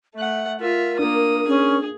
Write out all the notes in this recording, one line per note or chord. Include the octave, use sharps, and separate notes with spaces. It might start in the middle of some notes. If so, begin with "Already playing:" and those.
A3 E5 F#5
F4 A#4 E5
A#3 D4 D#6
C#4 G#4